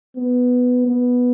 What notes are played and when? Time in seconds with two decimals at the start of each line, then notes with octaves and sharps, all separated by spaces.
0.16 B3
0.87 B3